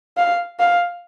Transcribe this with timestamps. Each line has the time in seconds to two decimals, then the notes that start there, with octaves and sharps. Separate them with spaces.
0.17 F5
0.60 F5